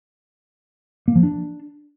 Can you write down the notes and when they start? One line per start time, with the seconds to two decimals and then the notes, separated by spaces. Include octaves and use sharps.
1.08 A#3
1.15 F3
1.23 D4